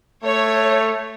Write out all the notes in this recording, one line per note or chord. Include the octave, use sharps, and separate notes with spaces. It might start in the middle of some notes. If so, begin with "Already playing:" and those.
A3 C#5